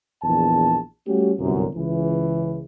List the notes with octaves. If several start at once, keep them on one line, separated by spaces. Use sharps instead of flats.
A#1 E2 A5
G3 A3 C#4 F#4 G4
G1 C2 F#2
C#2 E3